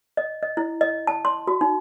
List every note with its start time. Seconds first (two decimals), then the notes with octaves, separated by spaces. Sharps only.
0.17 D#5
0.43 D#5
0.57 E4
0.81 D#5
1.07 A5
1.25 C6
1.47 F#4
1.61 D#4